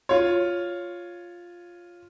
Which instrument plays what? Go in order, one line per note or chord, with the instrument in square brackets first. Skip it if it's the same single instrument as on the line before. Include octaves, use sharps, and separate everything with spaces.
[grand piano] F4 C#5